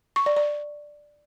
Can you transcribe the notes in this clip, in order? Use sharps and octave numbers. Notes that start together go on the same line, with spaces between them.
C#6
D5
D5